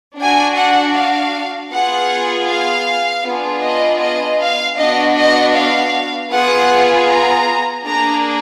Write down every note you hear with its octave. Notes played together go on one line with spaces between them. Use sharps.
D4 F#4 G#5
F#5
F5
B3 F4 G#4 F#5
F5
B3 D4 F4 G#4
D#5
D#5
F5
B3 D4 F#4 D#5
D#5
F5
B3 F4 G#4 F#5
A#5
A#3 D4 G#4 A#5